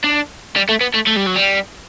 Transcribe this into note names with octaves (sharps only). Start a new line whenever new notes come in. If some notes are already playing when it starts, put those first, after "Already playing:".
D4
G3
A3
B3
A3
A3
G3
F#3
G3